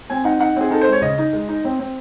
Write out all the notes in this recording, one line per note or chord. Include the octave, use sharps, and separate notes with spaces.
C4 G#5
D#4 F#5
D#4 F#5
C4 G#4
D#4 A4
C5
G#3
C#5
C#3 D#5
D#4
G#3
D#4
C4
C4